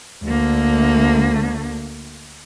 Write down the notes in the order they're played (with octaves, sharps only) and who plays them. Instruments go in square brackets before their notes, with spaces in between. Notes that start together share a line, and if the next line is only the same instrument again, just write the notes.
[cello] D2 A#3